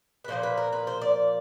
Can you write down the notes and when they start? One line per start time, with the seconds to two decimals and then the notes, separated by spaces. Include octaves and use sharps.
0.24 B4
0.28 A#2 F3 A#3 C5
0.43 B4
0.57 A#4
0.73 B4
0.87 C5
1.02 D5